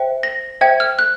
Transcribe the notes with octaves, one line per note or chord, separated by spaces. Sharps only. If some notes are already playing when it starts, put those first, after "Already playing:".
Already playing: C5 E5 G5
A#6
C5 E5 G5 G#6
F6
F#6